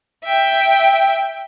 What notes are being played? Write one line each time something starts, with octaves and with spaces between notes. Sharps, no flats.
E5 G5